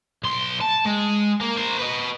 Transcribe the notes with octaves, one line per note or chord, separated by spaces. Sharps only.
B1 C6
A5
G#3
A#3
A#4 C5
B4 D#5